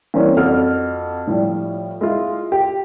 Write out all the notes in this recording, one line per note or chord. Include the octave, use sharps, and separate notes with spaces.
E3 G3 A#3 C4 C#4
F2 F#4 A4 F6
A2 F3 G3
G#3 E4 F4
G4